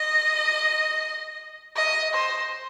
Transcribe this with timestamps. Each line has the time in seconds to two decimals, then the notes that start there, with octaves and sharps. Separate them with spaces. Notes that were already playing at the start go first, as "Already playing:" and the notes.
Already playing: D#5
1.76 D#5
2.13 C5